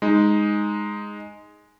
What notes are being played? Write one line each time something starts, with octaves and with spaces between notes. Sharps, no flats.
G#3 D#4